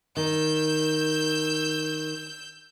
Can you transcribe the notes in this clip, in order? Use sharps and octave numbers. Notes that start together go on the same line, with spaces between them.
D#3 E6 G6